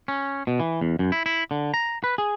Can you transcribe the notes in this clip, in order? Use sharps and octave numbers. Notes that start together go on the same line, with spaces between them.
C#4
B2
E3
E2
F#2
E4
E4
D3
A#5
B4
G#4